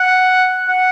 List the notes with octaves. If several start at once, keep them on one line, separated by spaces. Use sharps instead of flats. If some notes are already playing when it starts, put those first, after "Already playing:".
Already playing: F#5
F#5